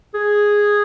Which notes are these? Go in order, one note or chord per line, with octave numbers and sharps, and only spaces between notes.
G#4